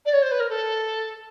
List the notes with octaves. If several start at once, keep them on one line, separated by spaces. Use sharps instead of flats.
D5
C#5
C5
B4
A#4
A4